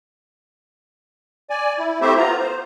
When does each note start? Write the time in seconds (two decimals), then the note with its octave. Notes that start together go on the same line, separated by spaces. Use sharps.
1.50 D5 G#5
1.78 E4
2.01 A3 C4 E4 G4 C5 E5
2.18 B3 F4 A#5
2.40 C5